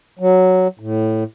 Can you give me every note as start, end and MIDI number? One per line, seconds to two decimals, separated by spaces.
0.19 0.68 54
0.80 1.24 45